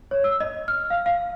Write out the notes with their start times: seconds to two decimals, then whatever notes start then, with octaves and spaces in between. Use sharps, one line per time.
0.11 C#5
0.24 E6
0.40 D#5
0.68 F6
0.90 F5
1.06 F5